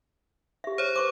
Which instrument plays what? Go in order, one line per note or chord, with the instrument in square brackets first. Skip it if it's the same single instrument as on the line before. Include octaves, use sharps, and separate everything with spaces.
[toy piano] G4 E5
[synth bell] C5 C#5
[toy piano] B4 C#6 D6